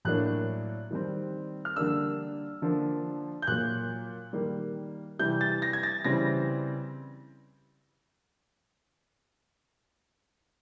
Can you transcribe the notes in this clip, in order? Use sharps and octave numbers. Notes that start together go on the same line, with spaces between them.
A2 F#3 A#3 D4 F#6
D#3 G3 C4
F6
D3 G3 A#3 D4 E6
D3 F3 A#3 D4
G6
A#2 F#3 A#3 F#6
D#3 G3 A#3
C3 E3 G3 G6
A6
A#6
G#6
A6
C#3 E3 G3 C4 A#6